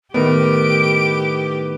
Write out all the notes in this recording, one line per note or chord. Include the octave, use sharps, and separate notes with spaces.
A2 D#3 B3 G4 A#4 D7